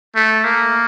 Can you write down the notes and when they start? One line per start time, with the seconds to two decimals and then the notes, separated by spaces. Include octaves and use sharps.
0.15 A3
0.44 A#3